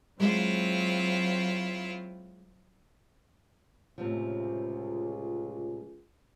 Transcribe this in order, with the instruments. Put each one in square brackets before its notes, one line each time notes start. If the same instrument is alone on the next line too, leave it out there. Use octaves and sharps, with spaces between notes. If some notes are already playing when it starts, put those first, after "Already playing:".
[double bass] F#3 C4 [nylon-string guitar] G#3 [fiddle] E4 F4
[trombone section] C#2 [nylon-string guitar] A2 C3 F3